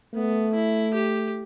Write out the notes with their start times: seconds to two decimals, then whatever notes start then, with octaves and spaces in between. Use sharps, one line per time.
0.14 A3 B3
0.54 E4
0.94 G4